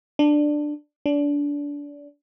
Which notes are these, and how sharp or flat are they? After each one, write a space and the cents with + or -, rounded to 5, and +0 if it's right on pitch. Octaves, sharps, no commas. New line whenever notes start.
D4 +10
D4 -25